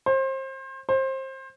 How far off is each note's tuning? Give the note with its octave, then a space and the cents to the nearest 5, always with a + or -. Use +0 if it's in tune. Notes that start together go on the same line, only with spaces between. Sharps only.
C5 +30
C5 +25